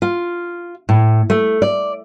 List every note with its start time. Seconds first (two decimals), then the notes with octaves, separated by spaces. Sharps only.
0.02 F4
0.89 A2
1.30 A3
1.62 D5